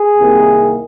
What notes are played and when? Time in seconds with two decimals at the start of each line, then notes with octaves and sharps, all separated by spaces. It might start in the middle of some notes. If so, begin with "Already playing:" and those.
Already playing: G#4
0.18 C2 C3 D#3 A#3